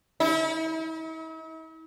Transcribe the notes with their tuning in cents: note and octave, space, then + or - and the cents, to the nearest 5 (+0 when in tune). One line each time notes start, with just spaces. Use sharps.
E4 -45